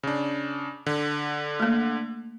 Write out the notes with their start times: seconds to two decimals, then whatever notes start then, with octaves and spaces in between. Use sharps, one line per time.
0.03 C#3 D4
0.86 D3
1.60 A3 A#3